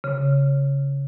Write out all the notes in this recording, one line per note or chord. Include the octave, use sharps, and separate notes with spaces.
C#3